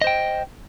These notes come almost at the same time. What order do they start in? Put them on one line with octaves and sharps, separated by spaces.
D#5 C5 G5